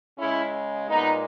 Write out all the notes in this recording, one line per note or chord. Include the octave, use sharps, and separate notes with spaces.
C#3 G#3 C#4 E4
A#2 G#3 B3 D#4